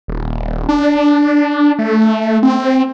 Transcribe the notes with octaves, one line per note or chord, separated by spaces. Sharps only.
D#1
D4
A3
C4